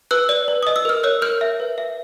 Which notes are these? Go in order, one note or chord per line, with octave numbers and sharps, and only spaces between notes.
B4 E6 F#6
D5
B4
D#5 D#6
E6
A#4 F6
C#5 E6 F#6
A#4 F6 G6
E5
B4
E5